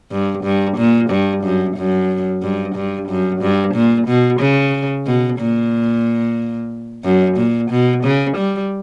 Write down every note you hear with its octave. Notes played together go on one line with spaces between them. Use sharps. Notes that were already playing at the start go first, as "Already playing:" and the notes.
G2
G2
A#2
G2
F#2
F#2
G2
G2
F#2
G2
A#2
B2
C#3
B2
A#2
F#2
A#2
B2
C#3
G3